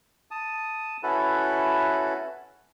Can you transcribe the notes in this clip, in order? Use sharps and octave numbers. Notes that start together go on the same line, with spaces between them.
A5 D#6
C#4 E4 F#4 A4 B4